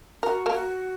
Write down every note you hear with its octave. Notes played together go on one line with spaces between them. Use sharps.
F#4 A#4
A#3 A#4
F#4